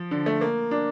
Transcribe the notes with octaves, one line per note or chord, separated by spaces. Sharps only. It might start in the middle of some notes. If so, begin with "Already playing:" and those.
Already playing: F3
D3
A3
A#3
D4